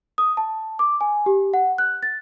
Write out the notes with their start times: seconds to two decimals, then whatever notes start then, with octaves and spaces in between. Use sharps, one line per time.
0.18 D#6
0.37 A5
0.79 D6
1.01 G#5
1.26 G4
1.54 F#5
1.78 F#6
2.03 A6